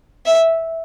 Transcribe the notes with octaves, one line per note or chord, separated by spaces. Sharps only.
E5